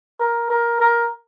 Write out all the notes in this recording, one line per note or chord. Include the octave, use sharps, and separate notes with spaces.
A#4
A#4
A#4